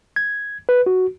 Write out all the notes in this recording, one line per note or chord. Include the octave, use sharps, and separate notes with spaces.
G#6
B4
F#4